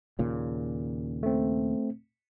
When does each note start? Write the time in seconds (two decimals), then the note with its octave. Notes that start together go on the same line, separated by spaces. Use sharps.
0.19 D#2 A#2 C#3
1.23 A3 C4